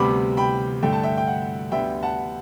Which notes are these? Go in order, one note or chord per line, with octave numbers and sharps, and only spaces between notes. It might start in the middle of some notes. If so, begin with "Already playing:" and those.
Already playing: D2 C3 G3 B3 B5 D6
G5 B5
G2 D3 A3 G5
A5
E5 G5
G5
F#5
D2 D3 G3 B3 E5 G5
F#5 A5